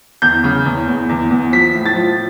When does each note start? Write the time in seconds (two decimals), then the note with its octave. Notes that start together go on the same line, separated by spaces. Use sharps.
0.22 E2 G6
0.44 C#3
0.65 E2
0.88 E2
1.09 E2
1.31 E2
1.52 F3 B6
1.74 A2
1.85 A6
1.96 F3